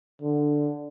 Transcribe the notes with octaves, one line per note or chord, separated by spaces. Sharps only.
D3